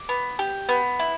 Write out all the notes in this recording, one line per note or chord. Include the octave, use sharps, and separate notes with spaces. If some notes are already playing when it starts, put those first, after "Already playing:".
Already playing: D6
B3
G4
B3
E4